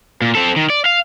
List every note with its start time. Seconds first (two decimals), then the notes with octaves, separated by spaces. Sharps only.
0.22 A#2
0.35 C4 A4
0.56 D#3
0.70 D5
0.85 F5